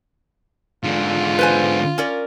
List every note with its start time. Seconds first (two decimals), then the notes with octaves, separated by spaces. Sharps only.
0.84 G#2 D3 F4
1.39 B4 C5 G#5
1.98 C#4 A#4 D5